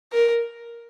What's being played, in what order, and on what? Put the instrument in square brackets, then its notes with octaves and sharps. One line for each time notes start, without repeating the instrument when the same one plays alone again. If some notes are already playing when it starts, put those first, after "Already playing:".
[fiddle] A#4